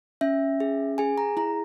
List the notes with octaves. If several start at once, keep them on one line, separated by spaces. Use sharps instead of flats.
C#4 E5
G#4
G#4 G#5
A#5
E4 A#5